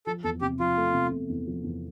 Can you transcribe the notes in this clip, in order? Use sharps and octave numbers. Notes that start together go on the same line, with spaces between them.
F3 A4
E2 A4
C3 G4
F3 F4
A3
C3
C3
E2
F3
E2